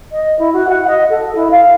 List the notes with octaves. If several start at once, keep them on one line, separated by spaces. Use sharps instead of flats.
D#5
E4
F#4
F#5
D#5
A4
E4
F5